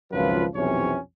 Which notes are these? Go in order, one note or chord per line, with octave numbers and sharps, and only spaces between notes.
G#1 C#2 F#2 F3 F4 B4
B1 F2 C3 E3 C#4 C#5